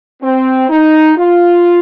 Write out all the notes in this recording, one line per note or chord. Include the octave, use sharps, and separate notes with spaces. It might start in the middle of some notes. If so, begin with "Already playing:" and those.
C4
D#4
F4